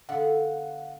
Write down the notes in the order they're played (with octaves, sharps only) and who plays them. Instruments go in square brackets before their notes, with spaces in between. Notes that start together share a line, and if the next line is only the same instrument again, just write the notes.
[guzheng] D3 B3 [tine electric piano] F5 F#5